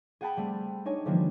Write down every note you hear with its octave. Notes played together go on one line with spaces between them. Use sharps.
G#4 F#5 G5 A5 B5
G3 A3 C4
D4 D#4 C#5 G#5
D3 E3 F3 G3 G#3 A#3